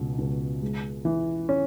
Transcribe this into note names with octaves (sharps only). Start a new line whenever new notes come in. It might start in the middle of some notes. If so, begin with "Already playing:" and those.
Already playing: C#2 B2
C#2
G#3
E3
C#4